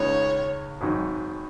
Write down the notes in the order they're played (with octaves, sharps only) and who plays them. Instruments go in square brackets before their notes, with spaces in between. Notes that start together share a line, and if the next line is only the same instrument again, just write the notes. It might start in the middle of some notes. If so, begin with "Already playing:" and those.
Already playing: [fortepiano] C#2 C#3 G#3 D#4 B4 [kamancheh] C#5
[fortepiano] G#1 G#2 F#3 D#4